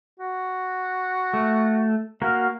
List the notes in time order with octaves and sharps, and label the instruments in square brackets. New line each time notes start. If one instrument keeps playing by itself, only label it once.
[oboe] F#4
[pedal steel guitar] A3
[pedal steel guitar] A#3 F#4 A#4 [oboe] F5